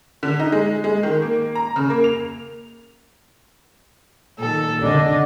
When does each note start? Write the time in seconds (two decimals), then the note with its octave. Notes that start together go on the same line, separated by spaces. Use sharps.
0.23 D3
0.40 D#4
0.52 G#3
0.84 G#3
1.03 D#3
1.22 A#3
1.55 A#5
1.76 C#3
1.90 A#3
2.04 F7
4.39 A#2 D#3 A4
4.82 D3 D4 D#5